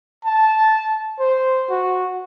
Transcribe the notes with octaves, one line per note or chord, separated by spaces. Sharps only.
A5
C5
F#4